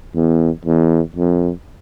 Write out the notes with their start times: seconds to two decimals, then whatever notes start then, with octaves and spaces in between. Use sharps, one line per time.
0.15 E2
0.65 E2
1.16 F2